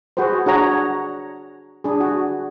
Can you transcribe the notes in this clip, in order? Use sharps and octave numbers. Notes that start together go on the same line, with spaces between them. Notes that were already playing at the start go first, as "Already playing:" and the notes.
F#4 G#4 B4 C5
D4 F#4 G#4 C#5 F#5 A#5
D4 G#4
F#4